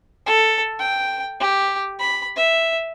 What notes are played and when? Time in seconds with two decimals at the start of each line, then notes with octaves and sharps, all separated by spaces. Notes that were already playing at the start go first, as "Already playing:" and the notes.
0.26 A4
0.79 G5
1.40 G4
1.99 B5
2.36 E5